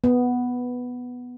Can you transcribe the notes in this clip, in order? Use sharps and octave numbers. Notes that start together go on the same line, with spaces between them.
B3